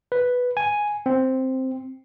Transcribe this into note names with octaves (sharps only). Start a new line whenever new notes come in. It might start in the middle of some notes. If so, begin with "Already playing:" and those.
B4
G#5
C4